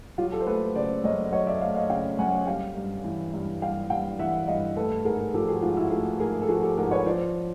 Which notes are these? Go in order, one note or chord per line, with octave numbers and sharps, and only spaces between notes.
F#3 F4 G4
G4 A4
C5
A3 A4 B4
C#3 C5 D5
F#2 C#5 D#5
F#3 C#5 D#5
D5 E5
A3 D#5 F5
D#5 F5
C#3 F5 G5
F#2 F#5 G#5
G3 F5 G5
G2
E3
G2
G3 F5 G5
G2 F5 G5
E3 E5 F#5
G2 D#5 F5
A3 A4 B4
G#2 G#4 A#4
F3 G4 A4
F#4 G#4
G#2 F4
E4 F#4
A3 F#4 G#4
G#2 G#4 A#4
A4
F3 F#4 G#4
G4 A4
G#2 G#4 A#4
B4 C#5
F3 C5 D5